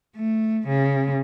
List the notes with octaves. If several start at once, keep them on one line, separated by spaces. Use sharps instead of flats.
A3
C#3